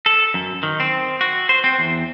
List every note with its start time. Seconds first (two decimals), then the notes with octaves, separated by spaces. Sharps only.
0.06 A4
0.34 F#2
0.63 D#3
0.80 C4
1.21 F#4
1.49 C5
1.64 C4
1.79 E2